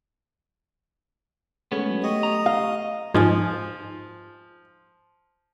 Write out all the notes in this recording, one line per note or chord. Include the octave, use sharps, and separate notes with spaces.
G#3 A3 B3 C#4
F#3
A3 G4 D#5 C#6
A#5
F5
G#2 F3 D#4 G#5